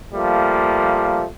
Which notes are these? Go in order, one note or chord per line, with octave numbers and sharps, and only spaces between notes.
F3 G3 A3 A#3